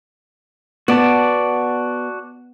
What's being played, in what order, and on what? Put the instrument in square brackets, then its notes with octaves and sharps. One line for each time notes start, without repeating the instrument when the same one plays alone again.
[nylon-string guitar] B3 [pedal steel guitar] F#4 D5 A5